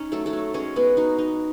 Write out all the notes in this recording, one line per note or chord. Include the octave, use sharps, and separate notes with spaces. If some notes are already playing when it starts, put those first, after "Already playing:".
Already playing: C#4 D#4 C#5
F#3 A3 A4
A3 A4
F#3
G#3 C#4 C#5
G#3 B3 B4
D#4 F#4
D#4